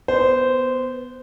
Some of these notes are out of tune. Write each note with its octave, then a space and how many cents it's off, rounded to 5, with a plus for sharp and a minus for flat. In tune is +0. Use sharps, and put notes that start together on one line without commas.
B3 +5 C5 -15